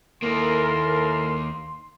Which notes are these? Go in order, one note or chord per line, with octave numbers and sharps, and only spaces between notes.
D#2 A#3 E4 A4 A#4 C6